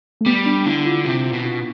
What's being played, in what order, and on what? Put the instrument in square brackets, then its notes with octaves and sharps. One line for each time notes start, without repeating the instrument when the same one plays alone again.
[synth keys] A3
[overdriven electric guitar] G3 [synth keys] B3
[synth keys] D4
[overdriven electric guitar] D3 [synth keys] E4
[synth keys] F4
[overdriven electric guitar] C3 [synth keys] F4
[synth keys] F4
[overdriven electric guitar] B2
[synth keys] F4